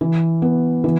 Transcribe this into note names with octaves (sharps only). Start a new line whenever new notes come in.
E3
B3
E3